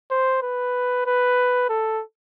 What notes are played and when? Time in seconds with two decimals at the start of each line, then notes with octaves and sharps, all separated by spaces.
0.11 C5
0.42 B4
1.06 B4
1.69 A4